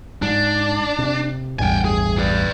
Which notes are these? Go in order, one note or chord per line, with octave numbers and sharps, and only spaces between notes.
G#2 D4
C3
A1 E2 G2 G5 G#5
G#4
B4 D5